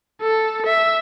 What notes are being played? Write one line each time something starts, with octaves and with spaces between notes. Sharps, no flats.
A4
E5